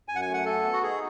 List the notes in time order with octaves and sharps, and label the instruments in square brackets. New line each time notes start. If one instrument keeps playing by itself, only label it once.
[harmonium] F#2 [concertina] G#5
[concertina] F#5
G#5
[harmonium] A3
[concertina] F#5
[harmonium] F#4 [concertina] A4
[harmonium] B3
[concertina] F#4
[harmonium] D#4 [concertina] G#4